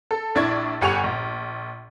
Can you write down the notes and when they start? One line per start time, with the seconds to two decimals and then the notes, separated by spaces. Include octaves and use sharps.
0.11 A4
0.35 A#1 D4 E4 D5 C#6 G#6
0.81 G1 G4 F#5 G#5 C#6 F7
1.04 A#1